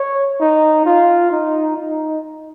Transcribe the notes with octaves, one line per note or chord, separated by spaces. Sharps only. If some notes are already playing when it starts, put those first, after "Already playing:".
Already playing: C#5
D#4
F4
D#4
D#4